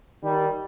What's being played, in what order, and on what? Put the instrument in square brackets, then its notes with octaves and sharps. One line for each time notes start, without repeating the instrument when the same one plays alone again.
[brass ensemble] D#3 G3